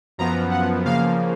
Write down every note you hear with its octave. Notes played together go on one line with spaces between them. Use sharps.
F#2 F3 B3 A#5
F#5
C#3 F3 A#3 F5